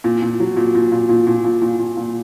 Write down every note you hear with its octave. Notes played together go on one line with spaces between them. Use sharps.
A#2
A#2
F#3
A#2
A#2
A#2
A#2
A#2
A#2
A#2
A#2
A#2